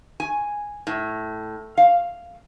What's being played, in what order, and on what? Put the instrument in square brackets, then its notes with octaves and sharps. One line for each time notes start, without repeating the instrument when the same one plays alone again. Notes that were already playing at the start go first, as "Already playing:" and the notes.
[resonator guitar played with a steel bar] G#5
A2
F5